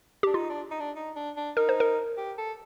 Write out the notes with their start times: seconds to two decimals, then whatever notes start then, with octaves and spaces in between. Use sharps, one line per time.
0.23 D4 G4
0.34 D#4 F4
0.50 D4
0.71 D#4
0.80 D4
0.96 D#4
1.16 D4
1.36 D4
1.56 D#4 A#4
1.69 C5
1.80 A#4
2.17 G4
2.38 A4